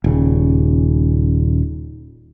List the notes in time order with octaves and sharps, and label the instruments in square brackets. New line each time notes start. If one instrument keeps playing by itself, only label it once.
[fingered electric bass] D#1 C#3